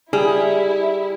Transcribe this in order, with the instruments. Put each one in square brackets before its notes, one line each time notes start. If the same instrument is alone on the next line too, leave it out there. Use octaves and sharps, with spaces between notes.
[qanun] G3 [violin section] E4 [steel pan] G#4